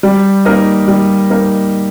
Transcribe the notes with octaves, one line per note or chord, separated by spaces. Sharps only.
G3
A#3 D#4 A#4 D#5
G3
A#3 D#4 A#4 D#5